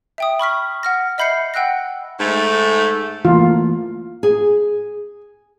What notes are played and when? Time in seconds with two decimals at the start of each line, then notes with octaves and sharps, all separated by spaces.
0.18 E5 G5 D#6
0.39 B5 C#6 F6 B6
0.83 F#5 F6 A#6
1.18 D#5 E5 B5 G6 C7 C#7
1.54 F#5 G5 E6 F#6 A#6
2.20 G#2 A3
3.25 E3 A3 A#3 F4
4.23 G#4